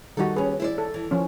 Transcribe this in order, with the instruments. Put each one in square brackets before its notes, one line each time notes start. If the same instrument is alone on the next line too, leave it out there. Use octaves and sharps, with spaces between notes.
[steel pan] D#3 G3 F#4 [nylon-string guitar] D#4 A4
[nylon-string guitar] D#2 C#4 [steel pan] G#4 B4
[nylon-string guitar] E4 C5 D5
[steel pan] A4
[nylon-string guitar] E3
[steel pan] F3 C#4